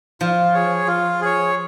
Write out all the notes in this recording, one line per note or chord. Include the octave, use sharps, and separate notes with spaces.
F3 F4
G#4 C#5
F4
G#4 C#5